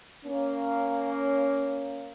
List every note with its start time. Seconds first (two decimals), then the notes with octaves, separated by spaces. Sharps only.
0.25 A#3 C#4